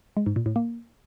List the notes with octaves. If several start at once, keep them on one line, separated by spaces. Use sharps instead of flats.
G#3
G#2
A#2
A2
A#3